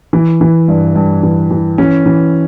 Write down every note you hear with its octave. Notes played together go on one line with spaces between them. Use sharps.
E3
E3
G2
G2
E3
E3
E3 C#4
E3